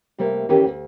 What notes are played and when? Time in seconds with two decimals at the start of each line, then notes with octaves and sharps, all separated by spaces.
0.18 C3 G3 A3 A#3
0.49 D#3 E3 A#3 C#4 G4 B4
0.64 D2